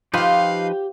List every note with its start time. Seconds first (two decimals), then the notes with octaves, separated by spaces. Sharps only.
0.14 F3 D#4 F4 G4 B4 C5 F5